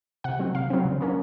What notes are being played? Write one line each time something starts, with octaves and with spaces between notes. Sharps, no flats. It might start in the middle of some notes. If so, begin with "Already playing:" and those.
C3 F#5
F#3 C4
C3 F5
F#3 C4
C#3
F#3 A#3 C#4